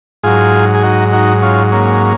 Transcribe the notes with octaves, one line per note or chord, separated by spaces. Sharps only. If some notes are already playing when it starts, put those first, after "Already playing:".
G#2 F#3 F4 G#4
G#4
D#4 F#4
D#4 F#4
C#4 F4
A#3 C#4